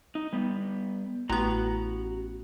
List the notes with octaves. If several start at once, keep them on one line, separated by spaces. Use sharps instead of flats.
D#4
G3 B3
A1 B3 F#4 A#5